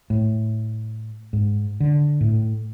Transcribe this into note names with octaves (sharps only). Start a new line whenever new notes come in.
A2
G#2
D3
A2